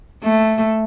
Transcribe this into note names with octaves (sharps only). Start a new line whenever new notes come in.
A3